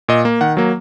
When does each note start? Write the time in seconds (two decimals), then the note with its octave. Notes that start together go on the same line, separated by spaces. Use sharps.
0.09 A#2 D#5
0.25 A#3
0.41 D#3 F#5
0.57 F#3 A#3